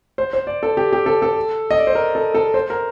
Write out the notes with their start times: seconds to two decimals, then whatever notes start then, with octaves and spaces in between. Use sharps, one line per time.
0.18 C5
0.33 C5
0.47 D5
0.63 A4
0.77 G4
0.93 G4
1.06 A4
1.22 A4
1.71 D#5
1.78 D5
1.87 C5
1.95 A#4
2.15 A4
2.34 A4
2.54 C5
2.70 A#4